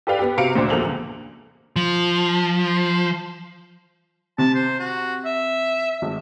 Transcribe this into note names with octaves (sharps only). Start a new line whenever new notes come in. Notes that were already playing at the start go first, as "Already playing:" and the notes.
G4 A4 B4 D5 F5 G5
B3 G4
C3 F#4 F5 A#5 C#7 D7
D2 A#2 D4 C5
E2 F3 A#3 A4 F7 F#7
C#2
F3
C3 A5
C5
F#4
E5
G#1